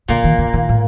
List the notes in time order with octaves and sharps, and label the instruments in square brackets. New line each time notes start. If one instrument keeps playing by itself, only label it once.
[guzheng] A#2 A#3 [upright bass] D3
[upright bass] D#3
D3
D#3
A2